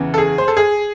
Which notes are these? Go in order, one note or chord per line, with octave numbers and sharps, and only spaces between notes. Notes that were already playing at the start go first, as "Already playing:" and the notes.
Already playing: E2 C#3 E3
A4
G#4
C5
A4
G#4